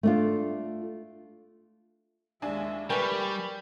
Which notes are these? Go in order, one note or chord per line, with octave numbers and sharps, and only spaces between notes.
A3 D4 F4
D#2 G#3 D4 E5 G#5
G3 A#4 B4 G5 G#5 B5 C#6